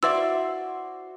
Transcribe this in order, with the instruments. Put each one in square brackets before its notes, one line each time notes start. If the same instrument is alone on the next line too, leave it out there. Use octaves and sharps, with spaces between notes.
[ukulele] E4 D5 E5 [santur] F#4 C5 D6 [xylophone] E6